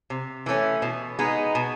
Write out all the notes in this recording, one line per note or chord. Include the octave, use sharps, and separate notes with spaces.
C3
E3 A3 C#4
B2
G#3 B3 D#4
B2